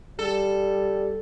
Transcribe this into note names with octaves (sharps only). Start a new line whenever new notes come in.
G3 A4